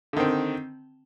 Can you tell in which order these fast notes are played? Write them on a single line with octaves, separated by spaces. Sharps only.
D3 D#3 C4